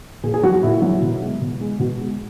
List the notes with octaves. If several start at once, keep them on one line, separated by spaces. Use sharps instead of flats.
A#2 G#4
G#4
F#3 F#4
F#4
A#2 E4
F#3
B2
G#3
B2
G#3
B2 F#4
G#3